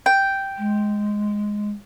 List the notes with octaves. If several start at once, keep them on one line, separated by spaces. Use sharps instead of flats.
G5
G#3